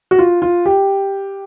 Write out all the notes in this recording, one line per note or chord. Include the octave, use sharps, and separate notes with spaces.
F#4
F4
F4
G4